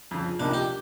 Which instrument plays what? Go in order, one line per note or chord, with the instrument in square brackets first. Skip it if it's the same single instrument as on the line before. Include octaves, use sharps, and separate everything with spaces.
[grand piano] F2 C#3 F3
[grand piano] C#2 C3 F3 A#3 D#4 [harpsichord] D4
[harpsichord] G4